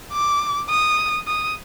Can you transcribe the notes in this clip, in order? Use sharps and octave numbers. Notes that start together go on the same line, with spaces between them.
D6
D#6
D#6